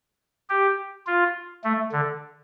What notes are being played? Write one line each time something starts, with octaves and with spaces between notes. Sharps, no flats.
G4
F4
A3
D3